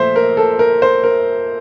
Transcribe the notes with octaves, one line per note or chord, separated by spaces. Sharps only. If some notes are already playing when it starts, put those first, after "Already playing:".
Already playing: A#2 F3 A3 C5 E5
A#4
A4
A#4
C5
A#4